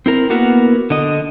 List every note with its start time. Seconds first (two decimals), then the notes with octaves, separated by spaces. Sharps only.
0.06 C4 E4 A#4
0.30 A#3 B3 E4 F#4 A#4
0.90 D3 D#5